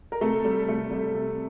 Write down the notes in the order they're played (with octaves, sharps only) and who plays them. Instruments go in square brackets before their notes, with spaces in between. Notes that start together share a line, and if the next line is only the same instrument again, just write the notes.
[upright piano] A#4
C3 A3 A4
G3
C3 A3 A4
G3
C3